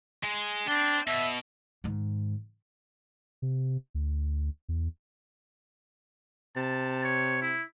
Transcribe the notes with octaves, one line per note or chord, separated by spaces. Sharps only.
G#3
D4 C5 G5
B2 E5
G#2 D#3
C3
D2
E2
C3 A5
C#5
E4